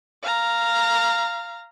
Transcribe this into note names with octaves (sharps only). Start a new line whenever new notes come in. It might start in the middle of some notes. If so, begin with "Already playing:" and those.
F5 A#5